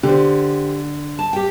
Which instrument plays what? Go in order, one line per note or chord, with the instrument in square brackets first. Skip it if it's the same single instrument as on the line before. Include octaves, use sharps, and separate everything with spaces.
[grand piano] D3 [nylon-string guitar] G4 C5
[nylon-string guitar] A5
G4 G5